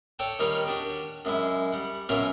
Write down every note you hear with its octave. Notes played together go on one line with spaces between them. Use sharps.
A4 C#5 D5 F#5 G5 A5
D#3 G3 A#3 D#4 F4 C#5
D4 F#4 G4 D5
F#2 G#3 E4
G3 F#5
F#2 B2 C#4 F4 A#4 E5